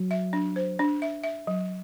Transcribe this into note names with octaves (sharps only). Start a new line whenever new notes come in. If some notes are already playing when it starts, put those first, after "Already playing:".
Already playing: F#3
E5
D4
C5
D4
E5
E5
F#3